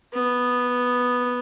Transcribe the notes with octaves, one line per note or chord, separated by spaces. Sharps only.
B3